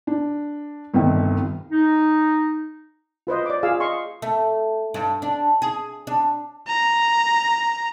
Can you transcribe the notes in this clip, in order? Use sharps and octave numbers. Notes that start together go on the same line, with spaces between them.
D4
G1 C2 C3 D#3
D#4
F4 B4 C5 D#5
D5 D6
F4 G#4 F5 G#5 E6
D#5 C6 C#6
A3
G2
D4
G#4
D4
A#5